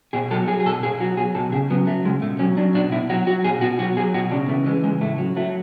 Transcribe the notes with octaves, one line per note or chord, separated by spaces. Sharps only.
B2 G#4
F#3 A4
F#3 G#4
G#4
B2 A4
B2 G#4
F#3 F#4
F#3 G#4
B2 A4
C#3 G#4
F#3 B3
F#3 A3
C#3 G#3
B2 A3
F#3 C#4
F#3 D4
B2 D4
B2 E4
F#3 F#4
F#3 F#4
B2 G#4
B2 F#4
F#3 F#4
F#3 G#4
B2 F#4
C#3 D4
E3 A3
E3 G#3
C#3 G#3
A2 A3
F#3
F#3 A3